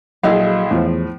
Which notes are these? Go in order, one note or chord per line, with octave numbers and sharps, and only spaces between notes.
A#1 F#3 E4 G#4 A4 D#5 F5
E2 A2 F3